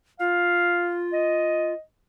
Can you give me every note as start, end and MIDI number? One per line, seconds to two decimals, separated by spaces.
0.20 1.73 65
0.20 1.07 77
1.13 1.78 75